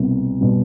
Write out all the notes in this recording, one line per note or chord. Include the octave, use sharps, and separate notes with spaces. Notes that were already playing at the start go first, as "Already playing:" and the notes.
Already playing: C2 B2 G3
B2 G3